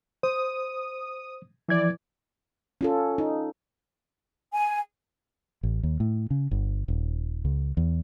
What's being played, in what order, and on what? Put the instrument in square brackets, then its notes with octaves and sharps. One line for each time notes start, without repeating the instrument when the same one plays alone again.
[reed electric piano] C5 [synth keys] D#6
[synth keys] E3 D5 [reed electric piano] F3 G#6
[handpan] C#4 F4 A4
D#4
[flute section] G#5
[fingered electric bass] A1
D#2
A2
C#3
G1
D#1
C#2
E2